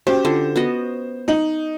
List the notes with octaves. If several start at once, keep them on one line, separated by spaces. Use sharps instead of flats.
C#4 F#4 G4 C5
D3 F4
B3 F#4 D#5
D#4 F#7